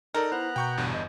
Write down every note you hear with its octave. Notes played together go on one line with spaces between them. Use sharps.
D#4 A4 A#4 D5
B3 E4 C5 A#5 F#6
B2 G5 C#6 G6
G1 E2 G2
D#5